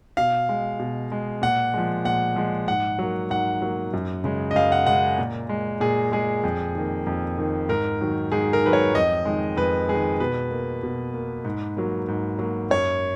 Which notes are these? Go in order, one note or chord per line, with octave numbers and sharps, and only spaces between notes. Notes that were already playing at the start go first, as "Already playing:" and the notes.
B2 F5
G#3
B2
G#3
A#2 F#5
F3 G#3
A#2 F#5
F3 G#3
G#2 F#5
F#3 A#3
G#2 F#5
F#3 A#3
F#2
C#3 G#3
D#5
F#2 F5
F#5
C#3 G#3 F#5
A#2
G#3
A#2 G#4
G#3 G#4
F2
D#3 A#3
F2
D#3 A#3
G#2 A#4
D#3 F#3
G#2 G#4
A#4
D#3 F#3 B4
C#5
F2 D#5
D#3 G#3
F2 B4
D#3 G#3 G#4
B2 B4
A#3
B2
A#3
G#2
F#3 A#3
G#2
F#3 A#3
F#2 C#5